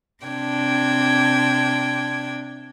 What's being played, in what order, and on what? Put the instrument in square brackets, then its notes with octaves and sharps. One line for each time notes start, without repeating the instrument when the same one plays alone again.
[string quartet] C3 D4 G5 G#6